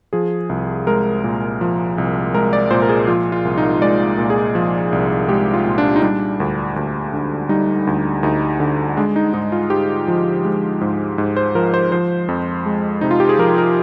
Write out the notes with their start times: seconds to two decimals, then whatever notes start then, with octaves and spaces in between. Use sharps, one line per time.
0.13 F3 G#4
0.49 C2
0.87 G#3 A#4
1.24 A#2
1.61 F3
1.98 C2
2.34 G#3 A#4
2.53 D5
2.71 A#2 C5
2.82 A#4
2.89 G#4
3.07 F3 F4
3.32 F4
3.45 C2
3.58 D#4
3.82 G#3 D5
4.18 A#2
4.30 G#4
4.55 F3
4.93 C2
5.29 G#3 G4
5.54 F4
5.66 A#2
5.78 D4
5.96 D#4
6.03 G3 D4
6.40 D2
6.76 D2
7.14 D3
7.49 G3 D#4
7.87 D2
8.23 D2 D#4
8.60 D3
8.97 G#3 D4
9.16 D#4
9.34 G#2 D#4
9.52 F4
9.70 G#2 G4
10.08 F3
10.45 G#3
10.81 G#2
11.18 G#2
11.37 C5
11.55 F3 A#4
11.74 C5
11.92 F3 C5
12.28 F2
12.66 G#3
13.01 C3 D#4
13.11 F4
13.20 G4
13.29 G#4
13.39 F3 A#4
13.58 A#4